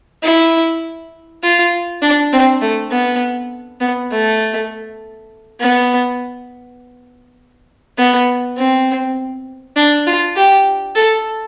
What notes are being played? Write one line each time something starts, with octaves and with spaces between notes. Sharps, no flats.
E4
F4
D4
C4
A3
B3
B3
A3
B3
B3
C4
D4
F4
G4
A4